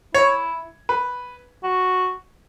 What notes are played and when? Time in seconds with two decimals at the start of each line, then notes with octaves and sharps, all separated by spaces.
0.14 E4 C#5
0.89 B4
1.64 F#4